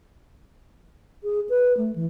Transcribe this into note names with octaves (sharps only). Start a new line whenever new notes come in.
G#4
B4
A3
E3